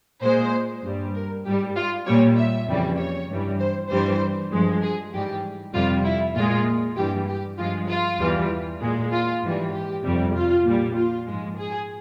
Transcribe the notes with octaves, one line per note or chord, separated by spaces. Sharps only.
A#2 G#3 C5
G2 G3
A#4
G#2 G3 G4
F4
A#2 G3 C#5
E5
F2 C#3 E3 G3
C#5
G2 E3 G3
C5
G2 E3 G3 C5
G2 F3 G#3
G#4
G#2 E3 G3 G4
F2 C3 G3 F4
E4
A#2 G#3 F4
G2 E3 G3 G4
G4
G2 F3 G#3 F4
F4
E2 E3 G3
A#2 G#3
F4
G#2 E3 G3
G4
F2 C3 G3
F4
A#2 G3
F4
G#2 F3 G#3
G#4